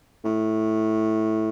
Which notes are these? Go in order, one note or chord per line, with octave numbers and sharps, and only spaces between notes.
A2